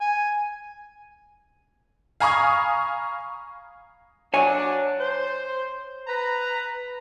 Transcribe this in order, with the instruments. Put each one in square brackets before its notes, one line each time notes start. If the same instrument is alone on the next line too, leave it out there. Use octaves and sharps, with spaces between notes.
[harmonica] G#5
[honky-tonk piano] F5 G#5 A#5 B5 C#6 D#6
[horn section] F#3 D4 [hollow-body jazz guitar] C#5 G#5
[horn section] C5
B4 A#5